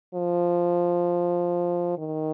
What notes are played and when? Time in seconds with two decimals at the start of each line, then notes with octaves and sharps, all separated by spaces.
0.15 F3
1.98 D#3